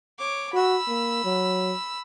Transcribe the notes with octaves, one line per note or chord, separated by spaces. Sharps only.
C#5 D6
F#4 B5 E6
A#3
F#3